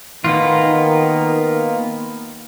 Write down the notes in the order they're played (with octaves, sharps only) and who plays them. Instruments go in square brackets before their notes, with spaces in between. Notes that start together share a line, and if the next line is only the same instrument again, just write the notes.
[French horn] D#3 [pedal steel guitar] A#3 B3 F4